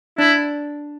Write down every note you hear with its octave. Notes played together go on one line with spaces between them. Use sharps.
D4 E4